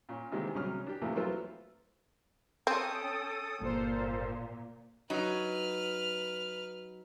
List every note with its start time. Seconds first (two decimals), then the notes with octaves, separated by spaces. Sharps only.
0.09 A#2 C#4
0.32 C3 D#3 E3 G#3 A#3 C4
0.55 C2 D3 F#3 C#4 D#6 F6
0.86 D4 G4
1.01 E2 C3 E3 F3 A3 A#3
1.16 F#3 C4 E4 F4 A4 B4
2.67 C4 C#4 A4 G5 D#6
3.61 G1 A#2 F4 A4 C5
5.10 F#3 D#4 B4 F6